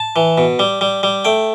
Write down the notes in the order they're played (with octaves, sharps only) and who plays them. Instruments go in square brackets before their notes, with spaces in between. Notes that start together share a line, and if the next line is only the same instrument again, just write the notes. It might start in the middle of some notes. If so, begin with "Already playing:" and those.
Already playing: [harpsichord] A5
E3
B2
G3
G3
G3
A3 G5